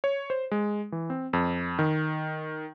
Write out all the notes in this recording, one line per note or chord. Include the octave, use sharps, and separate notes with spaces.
C#5
C5
G#3
E3
C4
F2
D#3